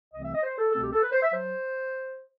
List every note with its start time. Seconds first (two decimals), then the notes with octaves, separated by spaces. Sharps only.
0.14 C2 C3 E3 A3 C4 D#5
0.25 E5
0.35 D#5
0.43 C5
0.58 A4
0.73 C2 B2 A3 C4 A4
0.83 G4
0.93 A4
1.03 B4
1.13 C5
1.22 E5
1.32 F#3 C5